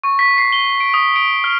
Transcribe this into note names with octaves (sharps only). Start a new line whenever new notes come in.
C#6
B6
C7
G7
D7
D#6
D7
F6